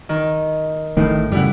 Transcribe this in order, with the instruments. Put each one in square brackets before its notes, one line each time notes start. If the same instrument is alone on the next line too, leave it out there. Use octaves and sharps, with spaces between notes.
[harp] D#3
[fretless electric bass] A1 D#3 E3 [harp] A2
[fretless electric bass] F#2 C#3 [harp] G3 E4 F#5